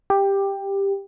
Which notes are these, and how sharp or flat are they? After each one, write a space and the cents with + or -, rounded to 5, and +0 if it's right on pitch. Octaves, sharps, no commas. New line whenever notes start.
G4 +10